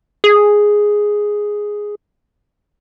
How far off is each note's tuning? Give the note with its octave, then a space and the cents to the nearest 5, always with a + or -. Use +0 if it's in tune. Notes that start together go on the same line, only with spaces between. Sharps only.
G#4 +0